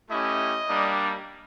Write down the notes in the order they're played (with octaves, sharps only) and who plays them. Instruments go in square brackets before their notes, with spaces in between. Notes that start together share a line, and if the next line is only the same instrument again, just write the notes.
[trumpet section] A3 C#4 E4 G4 D#5
G3 A#3 D4